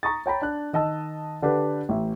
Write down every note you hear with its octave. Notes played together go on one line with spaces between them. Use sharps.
A#5 C#6 D#6 A6
C#5 G5 A#5 B5
D4 F#6
D#3 D#5 A5 E6
D3 D4 G4 B4
A1 E5